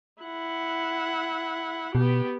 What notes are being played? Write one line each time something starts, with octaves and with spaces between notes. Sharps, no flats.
E4 F#5
B2 B3 G4